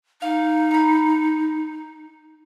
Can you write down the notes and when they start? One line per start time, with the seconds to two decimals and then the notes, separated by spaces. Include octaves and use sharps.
0.22 D#4 F5
0.71 A#5 B5